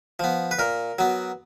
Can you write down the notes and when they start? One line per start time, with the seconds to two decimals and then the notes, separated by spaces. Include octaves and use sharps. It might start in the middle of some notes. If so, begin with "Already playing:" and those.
0.19 F3 B3
0.51 B4
0.59 A#2 A#4
0.99 F#3 B3